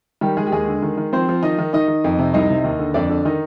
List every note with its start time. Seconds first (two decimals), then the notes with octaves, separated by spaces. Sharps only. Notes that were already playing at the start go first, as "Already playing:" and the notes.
0.21 D#3 G3 G4
0.37 D#3 G#3 G#4
0.47 G4
0.52 D#2 G#3 G#4
0.68 D3
0.82 D#3
0.98 D#3
1.13 F3 C4 C5
1.28 F3
1.43 D#3 D#4 D#5
1.59 D#3
1.73 D#3 D#4 D#5
1.88 D#3
2.04 F2
2.19 C3
2.34 C2 D#4 D#5
2.50 C3
2.64 D#2
2.79 D3
2.94 F2 D4 D5
3.10 D3
3.25 D#3 D#4